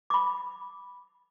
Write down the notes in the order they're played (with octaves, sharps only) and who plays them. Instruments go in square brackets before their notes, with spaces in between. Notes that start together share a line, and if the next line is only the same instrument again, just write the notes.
[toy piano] B5 D6